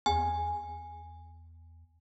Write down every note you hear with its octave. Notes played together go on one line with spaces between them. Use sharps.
E2 G#5